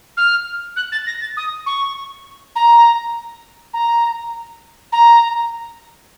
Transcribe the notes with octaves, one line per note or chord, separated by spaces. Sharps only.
F6
F#6
A6
A#6
A6
D#6
C#6
A#5
A#5
A#5